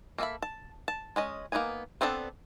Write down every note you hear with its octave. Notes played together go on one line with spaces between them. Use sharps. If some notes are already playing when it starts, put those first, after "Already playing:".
A#3 A4 D#5 E5 B5
A5
A5
G#3 C#4 D#5
A#3 B3 D4 D#4 G#5
B3 C4 D4 G#4 A4